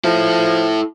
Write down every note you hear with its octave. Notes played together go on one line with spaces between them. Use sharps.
F3 E4 A4